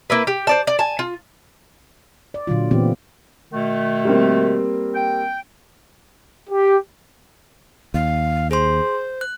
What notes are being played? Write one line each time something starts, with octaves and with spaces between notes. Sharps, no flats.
A#3 E4 B4
G4
C5 D5 A5
D5
G#5 A5
F4
D5
A#2 D3 F#3 F4
A#2 E3 A3 B3 C4 G4
B2 D#3 A3
G3 A#3 C4
G5
G4
D#2 F5
G#4 C5 C6
F#6